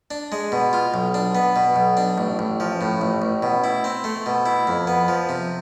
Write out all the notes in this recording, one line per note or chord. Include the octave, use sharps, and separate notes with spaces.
D4
G#3
B2
F4
B1
D4
B3
B2
B1
D4
A1
A1
F3
A2
A1
A1
B2
E4
C4
A3
B2
E4
F2
B3
F3
C3